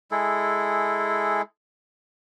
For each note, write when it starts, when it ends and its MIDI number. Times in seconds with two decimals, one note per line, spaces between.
0.11 1.42 56
0.11 1.42 64
0.11 1.42 68
0.11 1.42 69